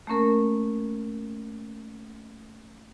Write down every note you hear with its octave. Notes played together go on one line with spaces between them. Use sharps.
A3 A#3 C#4 A#4